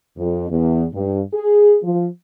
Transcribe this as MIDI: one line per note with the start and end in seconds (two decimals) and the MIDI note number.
0.18 0.45 41
0.50 0.84 40
0.92 1.21 43
1.34 1.76 68
1.83 2.06 53